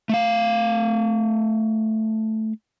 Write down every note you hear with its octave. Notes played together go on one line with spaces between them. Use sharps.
A3 F5